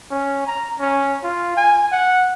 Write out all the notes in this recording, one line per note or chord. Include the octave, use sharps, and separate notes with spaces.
C#4
A#5
C#4
F4
G#5
F#5